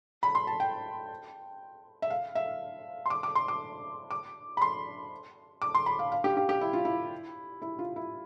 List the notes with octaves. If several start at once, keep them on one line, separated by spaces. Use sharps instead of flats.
B5
C6
A5
G5
E5
F5
E5
C6
D6
D6
C6
D6
D6
B5
C6
D6
C6
B5
F5
F5
G4
G4
G4
E4
F4
E4
E4
F4
E4